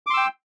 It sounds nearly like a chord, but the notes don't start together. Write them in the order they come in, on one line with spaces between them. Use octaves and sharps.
D6 C6 E6 G5